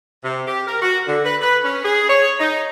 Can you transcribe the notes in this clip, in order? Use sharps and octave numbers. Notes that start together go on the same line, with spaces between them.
C3
G4
A#4
F#4
D3
B4
B4
C#4
G#4
C#5
D#4